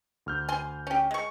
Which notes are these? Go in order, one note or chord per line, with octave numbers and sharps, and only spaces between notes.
D2 F6 G6
G#5 C6
C#4 G4
G#3 C#6